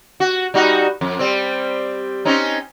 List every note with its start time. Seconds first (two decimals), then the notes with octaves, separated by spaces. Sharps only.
0.20 F#4
0.54 G3 D#4 F#4
1.01 F2
1.19 G3 C4
2.25 C4 C#4 D#4